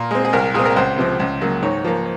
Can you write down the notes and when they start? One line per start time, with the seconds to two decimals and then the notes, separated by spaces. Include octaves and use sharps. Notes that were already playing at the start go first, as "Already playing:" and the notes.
Already playing: A#2 A#4
0.11 G#3 C4
0.25 G#4
0.33 C2 A#4
0.54 A#2 G#3 C4 G#4
0.65 A#4
0.76 C#2 C5
0.98 C3 F3 C4
1.20 C#2
1.41 C#3 F#3 A#3
1.62 G#2 C#5
1.84 F3 A#3